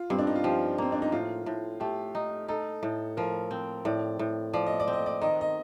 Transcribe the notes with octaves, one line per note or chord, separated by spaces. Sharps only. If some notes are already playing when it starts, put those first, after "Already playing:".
Already playing: F4
G2 C4
D4
D#4
F4
F3 G4
A#3 C4
D4
D#4
A2 F4
A2
A3 G4
D#4
D#4 A4
A2
F3 A#4
C4
A2 D5
A2
F3 D5
D#5
D5
C4
D#5
D5
D#3 D#5
D#5